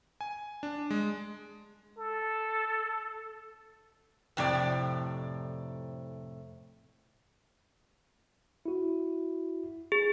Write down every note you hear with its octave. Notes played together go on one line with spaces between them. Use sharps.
G#5
D4
G#3
A4
F2 A2 C3 D5
E4 F#4
G#4